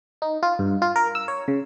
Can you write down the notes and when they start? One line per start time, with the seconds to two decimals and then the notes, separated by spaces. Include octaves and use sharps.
0.22 D#4
0.43 F4
0.59 G2
0.82 F4
0.96 A#4
1.15 E6
1.28 C#5
1.48 C#3